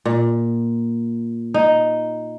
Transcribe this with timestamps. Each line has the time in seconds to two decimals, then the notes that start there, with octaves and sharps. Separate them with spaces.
0.05 A#2
1.54 D#4